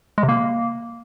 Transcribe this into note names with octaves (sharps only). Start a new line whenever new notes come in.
G#3
C3
A#3